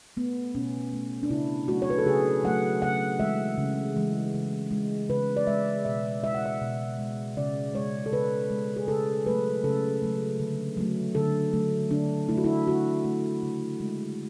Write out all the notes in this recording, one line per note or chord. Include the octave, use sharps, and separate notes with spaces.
A3 B3
B2 C#4
A3
D4
C#3 E4
F#3 A3 F#4
C#5
B4
A4
C#3 G#4
F#3 A3 F#5
C#3 F#5
E3 G#3 E5
C#3
E3 G#3
C#3
G#3
C#3 B4
D5
G#3 E5
B2 E5
G#3 E5
F#5
E5
B2
G#3
C#3 D5
G#3 C#5
A4
C#3 B4
G#3
G#4
C#3 A4
F#3 A3 B4
C#3 A4
F#3 A3
D3
F#3 A3
D3 A4
F#3 A3
D3 D4
A3 E4
F#4
E4
D3 F#4
A3
C#3
G#3